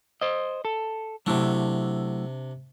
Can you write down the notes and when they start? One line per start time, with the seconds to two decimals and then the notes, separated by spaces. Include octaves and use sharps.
0.21 C5 D#5
0.65 A4
1.26 C3 F#3 A3 D4 E4